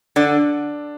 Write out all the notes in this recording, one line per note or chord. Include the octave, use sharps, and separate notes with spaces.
D3 D4